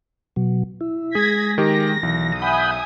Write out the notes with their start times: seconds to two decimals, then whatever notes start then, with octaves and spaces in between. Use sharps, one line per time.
0.36 B2 F#3
0.81 E4
1.15 G#3 G#4 G#6 A#6 B6
1.58 D#3 G4 A#6
2.03 B1 E3
2.42 E5 F#5 G#5 B5 D#6 G6